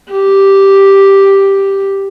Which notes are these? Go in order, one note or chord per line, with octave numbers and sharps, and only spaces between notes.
G4